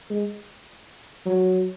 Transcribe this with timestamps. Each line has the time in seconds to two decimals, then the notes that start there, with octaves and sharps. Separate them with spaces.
0.10 G#3
1.26 F#3